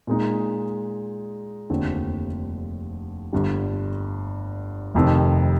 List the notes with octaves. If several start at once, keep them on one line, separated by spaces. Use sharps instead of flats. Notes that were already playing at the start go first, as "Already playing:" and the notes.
A#2 G#3 D#4
F1 D#2 D3 F3 C4
G1 G2 D3 G3
F1 F2 C3 D#3